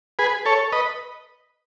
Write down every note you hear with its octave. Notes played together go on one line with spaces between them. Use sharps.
G#4 B4
A4 C#5
B4 D#5